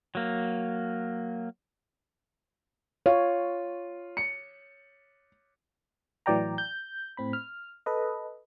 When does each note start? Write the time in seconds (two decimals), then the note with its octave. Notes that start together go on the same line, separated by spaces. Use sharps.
0.15 F#3 A#3
3.06 F4 C#5
4.17 C#7
6.26 A2 E3 F#3 D5 G5 A#5
6.58 G6
7.17 A2 C4 B5
7.33 F6
7.86 A4 B4 D#5